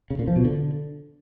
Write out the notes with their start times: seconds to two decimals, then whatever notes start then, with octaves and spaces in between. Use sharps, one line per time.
0.10 C#3
0.19 A#2
0.28 F3
0.36 B2
0.45 D3